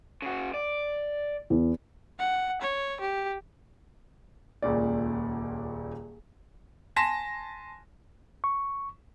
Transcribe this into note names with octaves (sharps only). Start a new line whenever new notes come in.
C#3 F#4
D5
E2
F#5
C#5
G4
D#1 C#2 A#2 D5
G#5 A5 C6 A#6 B6 E7
C#6